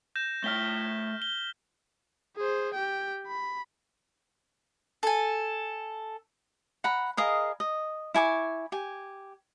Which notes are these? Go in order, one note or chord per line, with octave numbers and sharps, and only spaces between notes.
G6 A#6 E7
A3 G5 F6 B6 G7
G7
G#4 C5
G4 G5
B5
A4 G#5
F#5 A#5 B5
G#4 A#4 D#5 F5
D#5
E4 G#5 C#6 D6
G4 G#5